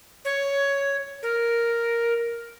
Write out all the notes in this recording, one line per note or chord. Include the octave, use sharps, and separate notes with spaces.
C#5
A#4